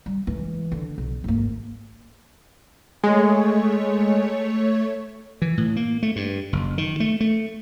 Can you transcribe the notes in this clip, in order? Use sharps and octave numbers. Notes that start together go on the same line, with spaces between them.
G3
E3 G#3
D3
B1
G#1 A#3
G#3 A3 C#5
E3
A2
A#3
A3
G2
F#1
D#3
A3
A3